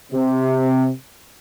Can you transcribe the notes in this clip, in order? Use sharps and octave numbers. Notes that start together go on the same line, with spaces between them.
C3